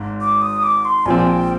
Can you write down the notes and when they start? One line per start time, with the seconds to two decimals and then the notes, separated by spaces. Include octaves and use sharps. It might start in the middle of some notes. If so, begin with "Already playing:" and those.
Already playing: G#1 G#2
0.21 D6
0.42 D#6
0.63 D6
0.85 C6
1.06 A#1 A#2 F3 C4 G#5
1.27 G5